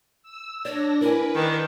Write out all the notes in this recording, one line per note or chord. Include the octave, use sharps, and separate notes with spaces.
E6
D4 C#5 D5 A#6
E4 A#4 B4 G#5
D#3 D4